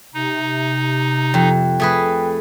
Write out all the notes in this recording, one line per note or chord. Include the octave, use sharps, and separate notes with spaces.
C3 D#4
F2 G5
A3 G#4 B4